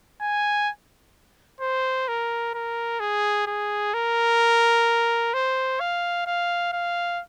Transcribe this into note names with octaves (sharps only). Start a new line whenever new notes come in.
G#5
C5
A#4
A#4
G#4
G#4
A#4
C5
F5
F5
F5